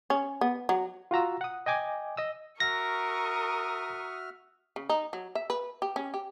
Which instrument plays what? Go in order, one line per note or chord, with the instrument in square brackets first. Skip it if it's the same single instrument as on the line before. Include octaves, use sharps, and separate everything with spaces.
[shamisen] C#4
B3
F#3
[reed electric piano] F4 F#4 A#5 E6
F#5 D#6
D#5 G5 G#5 D6
D#5 D#6 E6
[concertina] F#4 E5 F6 [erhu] A#4 [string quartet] C#6 D#6 [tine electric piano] A#6
[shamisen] C#3
D#4
F#3
E5
B4
G4
C#4
G4